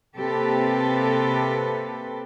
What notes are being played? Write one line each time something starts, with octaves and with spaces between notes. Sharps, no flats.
C3 A#3 C4 G4 A4 B4